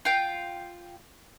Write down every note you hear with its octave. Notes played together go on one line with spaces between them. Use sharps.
F4 G5